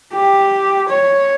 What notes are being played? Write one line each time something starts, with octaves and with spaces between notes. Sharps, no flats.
G4
C#5